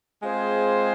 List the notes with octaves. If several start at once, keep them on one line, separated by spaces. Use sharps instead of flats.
G#3 C4 F4 G#4 C5